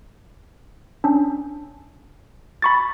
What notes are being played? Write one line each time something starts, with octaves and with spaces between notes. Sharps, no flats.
C#4 D4
B5 C#6 A6